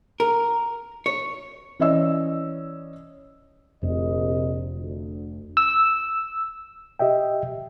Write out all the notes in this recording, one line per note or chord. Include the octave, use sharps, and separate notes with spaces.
A#4
C#5
E3 C#4 D5 D#5 E6
F1 A#1 C3 D#5
D2
E6
G4 D#5 E5 G5